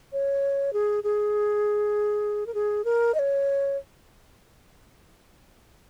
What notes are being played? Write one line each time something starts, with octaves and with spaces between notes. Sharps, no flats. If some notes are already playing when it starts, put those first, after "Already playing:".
C#5
G#4
G#4
A#4
G#4
A#4
D#5
C#5